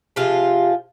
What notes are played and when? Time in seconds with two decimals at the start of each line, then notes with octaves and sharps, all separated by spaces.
0.16 C3 F3 G#3 F4